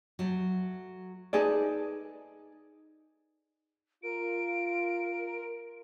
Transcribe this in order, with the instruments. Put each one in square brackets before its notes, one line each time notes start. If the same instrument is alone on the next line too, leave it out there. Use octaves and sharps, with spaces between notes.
[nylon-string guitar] F#3 A3
[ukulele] D#4 G#4 D5 [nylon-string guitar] A4 B4 A5
[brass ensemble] F4 [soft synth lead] A#4 [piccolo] D7